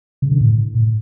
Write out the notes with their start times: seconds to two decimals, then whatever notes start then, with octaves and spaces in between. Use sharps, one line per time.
0.22 C#3
0.31 D3
0.41 A2